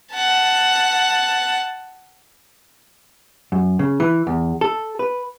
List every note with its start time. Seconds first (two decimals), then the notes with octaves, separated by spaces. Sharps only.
0.13 F#5 A5
3.52 F#2
3.79 C#3
4.00 E3
4.27 E2
4.61 A4
4.99 B4